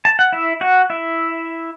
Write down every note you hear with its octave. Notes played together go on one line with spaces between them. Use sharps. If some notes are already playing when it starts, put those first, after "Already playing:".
A5
F#5
E4 E5
F#4 F#5
E4 E5